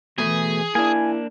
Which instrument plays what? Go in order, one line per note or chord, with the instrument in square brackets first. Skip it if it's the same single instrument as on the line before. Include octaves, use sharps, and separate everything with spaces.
[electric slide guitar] B2 A3 [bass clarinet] E3 [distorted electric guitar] G#4
[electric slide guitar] A#3 D4 [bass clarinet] E4 [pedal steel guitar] G#5